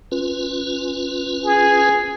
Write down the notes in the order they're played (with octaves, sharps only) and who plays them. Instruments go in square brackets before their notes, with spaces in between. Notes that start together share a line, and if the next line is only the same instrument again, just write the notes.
[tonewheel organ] C#4 F4 B4
[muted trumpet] G#4